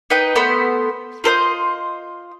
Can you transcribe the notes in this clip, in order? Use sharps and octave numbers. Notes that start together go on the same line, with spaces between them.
D#4 B4 D#5 G5
A3 B3 C5 B5
F4 A4 C5 D#5